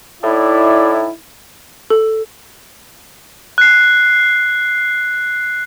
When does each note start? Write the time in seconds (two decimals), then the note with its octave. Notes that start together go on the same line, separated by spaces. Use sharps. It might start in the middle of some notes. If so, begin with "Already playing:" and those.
0.23 A2 D#4 E4 D5
1.90 A4
3.58 F#6 C7